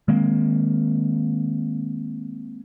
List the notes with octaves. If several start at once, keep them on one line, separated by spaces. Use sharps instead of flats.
D#3 G#3 A#3 C4